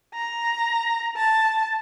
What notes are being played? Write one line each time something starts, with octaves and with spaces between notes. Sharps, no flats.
A#5
A5